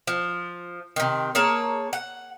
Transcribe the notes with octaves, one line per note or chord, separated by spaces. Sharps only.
F3
C3 D#3
A#3 G#4 C#5 A5
F#5